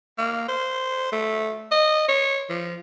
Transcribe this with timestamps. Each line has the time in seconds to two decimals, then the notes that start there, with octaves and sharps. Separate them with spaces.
0.18 A#3
0.49 C5
1.12 A3
1.71 D#5
2.08 C#5
2.49 F3